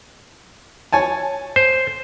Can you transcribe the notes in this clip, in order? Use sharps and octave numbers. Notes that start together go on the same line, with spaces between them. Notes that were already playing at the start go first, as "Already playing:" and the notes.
C#5 G#5 A5
C5